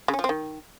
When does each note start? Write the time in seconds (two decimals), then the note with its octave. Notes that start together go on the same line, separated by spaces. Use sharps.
0.08 C#3
0.14 C#4
0.19 F3
0.24 C4
0.29 D#3